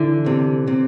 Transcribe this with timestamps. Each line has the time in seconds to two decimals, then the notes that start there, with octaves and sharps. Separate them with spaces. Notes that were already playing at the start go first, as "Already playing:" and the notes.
Already playing: D3 E3
0.26 C3
0.67 C3